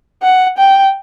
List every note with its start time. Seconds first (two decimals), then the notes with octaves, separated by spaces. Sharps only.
0.23 F#5
0.58 G5